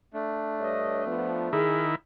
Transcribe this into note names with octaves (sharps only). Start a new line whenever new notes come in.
A3 D4
G2 C#5 D#5
F3 B3 F4
D#3 E4 G#4